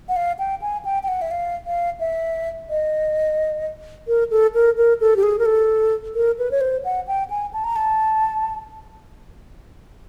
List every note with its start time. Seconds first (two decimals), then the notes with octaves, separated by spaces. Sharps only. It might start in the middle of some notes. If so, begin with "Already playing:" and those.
0.09 F#5
0.16 F5
0.39 G5
0.62 G#5
0.85 G5
1.03 G5
1.08 F#5
1.22 E5
1.31 F5
1.66 F5
2.00 E5
2.70 D#5
4.08 A#4
4.31 A4
4.54 A#4
4.77 A#4
5.00 A4
5.16 G4
5.23 G#4
5.39 A#4
5.46 A4
6.15 A#4
6.39 B4
6.51 C#5
6.61 C5
6.85 F#5
7.07 G5
7.30 G#5
7.53 A5
7.64 A#5
7.76 A5